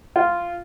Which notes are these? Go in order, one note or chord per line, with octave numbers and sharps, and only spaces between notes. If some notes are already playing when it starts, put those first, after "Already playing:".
F4